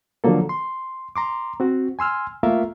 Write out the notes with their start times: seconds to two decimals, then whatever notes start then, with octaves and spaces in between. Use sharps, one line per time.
0.24 D3 F3 F#3 A#3 A4
0.49 C6
1.16 A#5 C6 D6
1.60 C4 F#4
1.99 G#5 C6 E6 F6
2.43 A3 A#3 F4 A#4 E5 F5